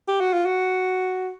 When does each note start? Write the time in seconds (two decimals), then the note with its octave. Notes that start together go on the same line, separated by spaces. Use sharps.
0.08 G4
0.20 F#4
0.33 F4
0.46 F#4